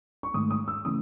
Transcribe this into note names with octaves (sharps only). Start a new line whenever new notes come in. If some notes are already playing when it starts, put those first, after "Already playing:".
C#6
G#2 D#3 A3 D#6
D#6
E6
C#3 E3 A3 D#6